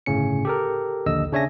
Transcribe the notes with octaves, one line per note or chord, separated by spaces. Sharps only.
G1 A2 C#3 C#4 C#7
G4 A4 A#4
A#1 D#2 D3 D#5 E6
C#3 D4 C#5 E5 G#5 A#6